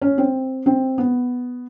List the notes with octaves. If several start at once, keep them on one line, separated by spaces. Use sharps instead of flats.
C#4
C4
C4
B3